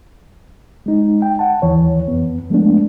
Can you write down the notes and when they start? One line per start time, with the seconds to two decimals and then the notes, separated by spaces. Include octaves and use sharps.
0.86 G#3 D#4
1.22 G5
1.39 F#5 A5
1.62 D#2 E3 C#5
2.08 F2 B3
2.50 F3 G#3 A3 B3 D4